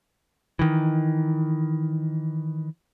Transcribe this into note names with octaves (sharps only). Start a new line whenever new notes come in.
D#3 E3